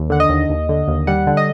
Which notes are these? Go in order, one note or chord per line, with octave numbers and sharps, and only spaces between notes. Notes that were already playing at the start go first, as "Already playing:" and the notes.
Already playing: D#2
D3 F#5
D#5
D#2
D#2
D3
D#2
G3 F#5
D3
D#5